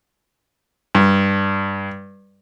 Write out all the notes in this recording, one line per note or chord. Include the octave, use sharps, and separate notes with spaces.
G2